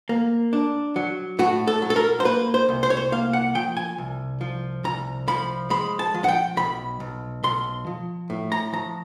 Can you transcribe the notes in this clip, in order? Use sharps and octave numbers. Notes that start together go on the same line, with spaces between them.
A#3
D4
F#3
A2 F#4
A4
F#3
A4
A#4
C5
A#3 B4
C5
C2
C5
C#5
C5
A#3 F5
F#5
F3 G5
G#5
C2
F3
C2 A#5
F3 B5
G#3 B5
A5
F3
F#5
G5
B1 B5
B1
B1 C6
F3
A2
A#5
F3 A#5